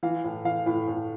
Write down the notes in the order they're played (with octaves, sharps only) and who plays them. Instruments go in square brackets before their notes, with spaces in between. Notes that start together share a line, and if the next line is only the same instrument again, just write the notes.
[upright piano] E3 F5
A2
E3 F5
A2
A2